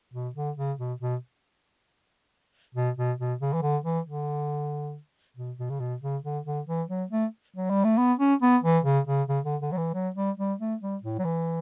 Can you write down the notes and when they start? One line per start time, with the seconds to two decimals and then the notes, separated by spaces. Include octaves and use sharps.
0.14 B2
0.35 D3
0.57 C#3
0.78 B2
1.01 B2
2.75 B2
2.97 B2
3.19 B2
3.40 C#3
3.53 E3
3.62 D3
3.84 E3
4.06 D3
5.37 B2
5.59 B2
5.70 C#3
5.80 B2
6.02 C#3
6.24 D3
6.45 D3
6.67 E3
6.89 F#3
7.10 A3
7.56 F#3
7.70 G3
7.84 A3
7.98 B3
8.19 C#4
8.42 B3
8.63 E3
8.85 C#3
9.07 C#3
9.28 C#3
9.45 D3
9.62 D3
9.72 F#3
9.77 E3
9.94 F#3
10.16 G3
10.38 G3
10.59 A3
10.81 G3
11.03 A2
11.19 F#3
11.25 E3